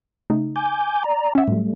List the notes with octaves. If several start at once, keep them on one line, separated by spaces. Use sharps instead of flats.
C#3 A3 D#4
G#5 D6 G6
D5 A#5
C#4 E5 F#5
A2 F#3 G3 A3